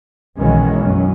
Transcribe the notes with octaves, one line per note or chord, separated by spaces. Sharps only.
B1 B2 D#3 E3 G#3 C#4
F#2 F#3 C#4